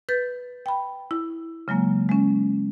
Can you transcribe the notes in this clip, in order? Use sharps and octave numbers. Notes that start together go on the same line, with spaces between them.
B4 G6 A6
G5 B5
E4
C#3 F#3 G#3 A#3
G#3 C#4